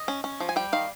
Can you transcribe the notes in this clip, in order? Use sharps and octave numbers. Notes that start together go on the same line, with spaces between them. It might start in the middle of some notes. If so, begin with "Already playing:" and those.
Already playing: D#5
C#4
C#4
F3
G#5
G3 G5
D#3 F5